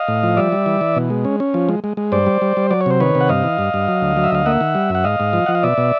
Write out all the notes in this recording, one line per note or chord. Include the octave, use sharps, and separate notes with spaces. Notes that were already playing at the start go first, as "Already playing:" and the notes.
Already playing: D#5 F5
A2
F3
G3 D5 E5
G3
E3
E3
B2
G#3
C#4
C#4
F3
G#3
G#3
G#3
G2 C5 D5
G3
G3
G3
F#3 D5
C#5
C3 C5
D#3 B4 C#5
C3
F#5
G2 D#5 F5
E3
G2
G2
F#3
D2
F#3
E5
D2 F5
A#3 E5 F#5
D#3
G3
F#2 F#5
G#2 D#5 F5
G#2
F3
F3 F#5
F5
B2 D5 E5
B2